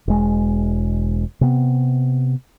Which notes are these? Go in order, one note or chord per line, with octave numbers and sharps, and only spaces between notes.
E1 G#3
C3 B3